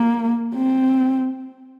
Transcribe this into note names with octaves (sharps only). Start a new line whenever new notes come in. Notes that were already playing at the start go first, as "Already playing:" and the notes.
Already playing: A#3
C4